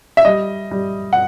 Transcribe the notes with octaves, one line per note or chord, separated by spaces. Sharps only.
E5
G3 D#5
G3
F#5